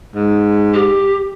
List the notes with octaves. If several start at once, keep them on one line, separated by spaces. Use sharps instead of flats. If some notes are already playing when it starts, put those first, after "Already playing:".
G#2
G4